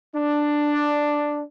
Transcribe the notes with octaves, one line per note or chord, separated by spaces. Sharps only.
D4